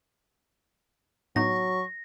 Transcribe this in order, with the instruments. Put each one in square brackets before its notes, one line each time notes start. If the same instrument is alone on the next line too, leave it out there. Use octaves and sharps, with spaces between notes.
[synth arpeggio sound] A2 B3 D#4 [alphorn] F#3 [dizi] C#6 [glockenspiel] A#6